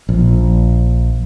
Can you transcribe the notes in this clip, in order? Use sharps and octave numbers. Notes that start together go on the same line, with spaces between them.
A#1